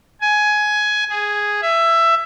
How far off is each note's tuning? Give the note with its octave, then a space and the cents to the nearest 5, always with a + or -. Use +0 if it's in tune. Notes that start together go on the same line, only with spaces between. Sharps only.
G#5 +15
G#4 +0
E5 +15